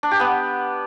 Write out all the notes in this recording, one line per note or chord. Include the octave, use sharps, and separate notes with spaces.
D4
G4
B3